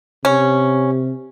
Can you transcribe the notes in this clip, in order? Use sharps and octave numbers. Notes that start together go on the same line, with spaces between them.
C3 C#4